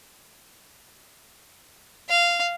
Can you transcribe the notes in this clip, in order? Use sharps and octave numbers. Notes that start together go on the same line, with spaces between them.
F5